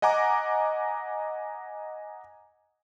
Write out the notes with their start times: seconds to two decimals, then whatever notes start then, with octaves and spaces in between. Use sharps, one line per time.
0.02 D#5 F#5 G#5 A#5 D6